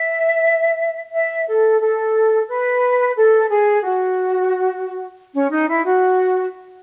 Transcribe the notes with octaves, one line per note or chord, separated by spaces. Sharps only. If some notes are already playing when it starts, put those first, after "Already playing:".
Already playing: E5
E5
A4
A4
B4
A4
G#4
F#4
C#4
D#4
E4
F#4